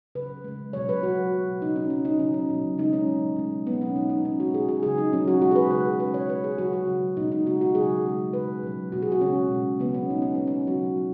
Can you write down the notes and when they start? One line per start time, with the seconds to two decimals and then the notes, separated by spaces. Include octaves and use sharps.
0.15 C#3 F#3 B4
0.44 C#3 G#3
0.73 B2 F#3 C#5
0.89 B4
1.03 B2 F#3 F#4
1.32 B2 F#3
1.62 C#3 F#3 D#4
1.76 C#4
1.90 C#3 F#3 C#4
2.05 D#4
2.20 C#3 F#3 C#4
2.34 C#4
2.50 B2 F#3
2.78 C#3 G#3 D#4
2.93 C#4
3.07 B2 F#3
3.36 B2 G#3
3.66 B2 B3
3.70 F#3
3.81 C#4
3.95 B2 D#4
4.00 F#3
4.10 D#4
4.25 C#3 G#3 C#4
4.40 F#4
4.54 B2 G#3 G#4
4.69 G#4
4.83 C#3 F#3 G#4
4.98 D#4
5.12 B2 F#3 C#4
5.28 F#4
5.42 B2 G#3 F#4
5.51 G#4
5.56 B4
5.70 C#3 G#3 B4
5.85 G#4
6.00 B2 G#3 B4
6.14 C#5
6.29 C#3 G#3 B4
6.44 G#4
6.58 C#3 F#3 F#4
6.73 F#4
6.87 C#3 F#3
7.17 B2 D#4
7.21 G#3
7.32 D#4
7.46 C#3 G#3 F#4
7.61 F#4
7.75 C#3 F#3 G#4
8.05 C#3 G#3
8.33 C#3 G#3 B4
8.63 B2 F#3
8.92 B2 F#3 F#4
9.02 G#4
9.12 F#4
9.21 C#3 G#3 C#4
9.51 B2 G#3
9.80 C#3 B3
9.85 F#3
9.94 C#4
10.10 C#3 G#3 D#4
10.22 C#4
10.35 B2 G#3 B3
10.47 C#4
10.67 C#3 F#3 F#4
10.97 F#3